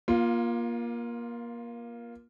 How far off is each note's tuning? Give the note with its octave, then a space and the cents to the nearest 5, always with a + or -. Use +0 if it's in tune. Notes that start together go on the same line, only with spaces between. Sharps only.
A#3 +25 F4 +0